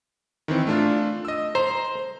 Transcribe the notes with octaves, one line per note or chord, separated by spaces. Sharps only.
D#3 E3 C4
A3 D4 F4
D#5 E6
C5 A#5